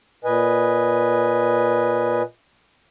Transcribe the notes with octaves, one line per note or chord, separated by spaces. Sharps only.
A#2 B4 D#5 G#5